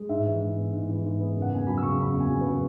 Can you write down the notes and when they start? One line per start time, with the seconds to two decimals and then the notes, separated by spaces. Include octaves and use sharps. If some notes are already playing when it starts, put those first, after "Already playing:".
Already playing: G#3
0.09 G#2 E5
0.26 E3
0.41 G#2
0.56 B3
0.73 G#2
0.89 E3
1.04 G#2
1.20 B3
1.36 F#1
1.42 F#5
1.52 E2 G#5
1.67 F#3 B5
1.78 E6
1.83 C#3 C#6
1.99 F#1 B5
2.14 E2
2.20 G#5
2.30 F#3
2.41 C#3 B4